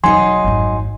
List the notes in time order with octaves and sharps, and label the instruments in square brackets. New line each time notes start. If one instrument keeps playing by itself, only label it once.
[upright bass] E1 E3 [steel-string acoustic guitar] F#3 D#4 D#5 [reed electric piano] G#5 C6
[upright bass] G#1 F2